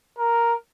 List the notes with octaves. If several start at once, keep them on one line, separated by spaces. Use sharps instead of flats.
A#4